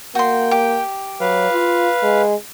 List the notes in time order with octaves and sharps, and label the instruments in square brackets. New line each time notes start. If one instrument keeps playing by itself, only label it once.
[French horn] A#3 [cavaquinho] F#4 C6 [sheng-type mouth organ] G5
[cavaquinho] G4
[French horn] F#3 [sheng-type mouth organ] B4 F5
[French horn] F4
G#3